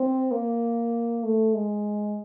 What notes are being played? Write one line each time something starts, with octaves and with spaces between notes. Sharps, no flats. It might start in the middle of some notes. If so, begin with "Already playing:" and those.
Already playing: C4
A#3
A3
G#3